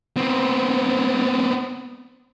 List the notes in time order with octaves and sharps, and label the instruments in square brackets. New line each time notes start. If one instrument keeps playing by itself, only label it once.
[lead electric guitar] B3 C4